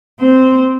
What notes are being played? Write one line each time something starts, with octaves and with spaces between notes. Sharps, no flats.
C4 C5